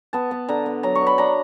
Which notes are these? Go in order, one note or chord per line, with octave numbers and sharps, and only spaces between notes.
B3 A5
B3
D3 A#5
B3
F#3 A#5
C#6
B3
B5
D4 A#5